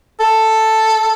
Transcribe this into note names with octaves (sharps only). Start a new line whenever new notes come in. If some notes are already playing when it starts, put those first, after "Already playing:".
A4